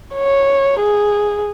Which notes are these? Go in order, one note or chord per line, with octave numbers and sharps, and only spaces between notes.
C#5
G#4